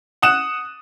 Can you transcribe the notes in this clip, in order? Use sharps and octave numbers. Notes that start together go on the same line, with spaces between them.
F#5 D#6 F#6 E7